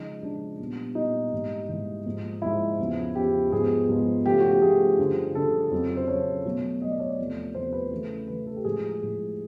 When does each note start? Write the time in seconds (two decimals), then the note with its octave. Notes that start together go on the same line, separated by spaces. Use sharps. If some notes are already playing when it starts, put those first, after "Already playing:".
Already playing: C#3 F3 G#3 D#4
0.22 C#3 F3 G#3 D4
0.59 A#2 G3 B3
0.95 A#2 G3 B3 D#4
1.32 G#2 E3 G3 A#3
1.69 G#2 E3 G3 A#3
2.06 G#2 F3 A#3
2.42 G#2 F3 A#3 E4
2.79 E2 C#3 F3
3.15 E2 C#3 F3 G4
3.52 G#2 F3 G#3 B3 G#4
3.89 G#2 F3 G#3 B3
4.25 C#3 F3 A3 G4
4.40 F#4
4.51 G4
4.62 C#3 F3 A3 G#4
4.99 G2 D3 F3
5.35 G2 D3 F3 A4
5.71 F2 C#3 F#3
5.97 C5
6.08 F2 C#3 F#3 C#5
6.45 B2 F#3 A3
6.82 B2 F#3 A3 D#5
6.90 D5
7.00 C#5
7.09 D5
7.18 E2 C3 F3 A3
7.55 E2 C3 F3 A3 C5
7.73 B4
7.91 C#3 E3 A3
8.28 C#3 E3 A3 B4
8.47 A4
8.56 G4
8.65 A2 F3 G#3 G#4
9.02 A2 F3 G#3